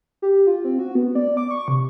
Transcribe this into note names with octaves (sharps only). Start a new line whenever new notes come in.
G4
F4
C4
F#4
B3
D5
D6
C#6
C3